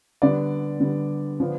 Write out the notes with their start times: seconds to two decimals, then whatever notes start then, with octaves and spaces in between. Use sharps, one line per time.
0.22 D3 G3 B3 D5
0.80 D3 G3 B3
1.40 D3 F3 B3